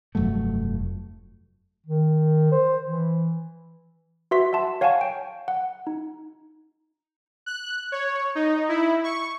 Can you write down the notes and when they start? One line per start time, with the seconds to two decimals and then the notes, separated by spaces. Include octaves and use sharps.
0.15 F1 G2 F#3 A3
1.86 D#3
2.52 C5
2.86 E3
4.31 F#4 B4 E5 C6 B6
4.53 E5 F#5 A5 C6
4.81 C#5 F5 F#5 G#5 A5 C#6
5.01 G5
5.48 F#5
5.87 D#4
7.46 F#6
7.92 C#5
8.35 D#4
8.69 E4
9.04 C#6